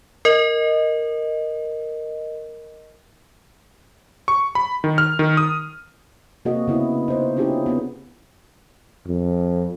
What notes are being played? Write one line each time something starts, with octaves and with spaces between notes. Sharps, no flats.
A#4 D#5
C#6
B5
D#3
F6
D#3
D#6
C3 A#3 C4 F#4 G#4 D#5
C#3 B3 E4
D#4 C5
C#4 D4 E4 F4 G4 G#4
B3 C4
F2